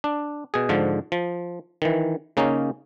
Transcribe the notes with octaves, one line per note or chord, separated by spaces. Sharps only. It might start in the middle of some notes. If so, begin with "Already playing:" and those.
D4
B2 G#4
G#2 D3 F3
F3
D#3 E3
C#3 A#3 C#4 D#4